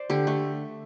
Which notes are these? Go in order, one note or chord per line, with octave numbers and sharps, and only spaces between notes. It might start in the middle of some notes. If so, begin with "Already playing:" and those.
Already playing: C5 D5
D3 G4
A3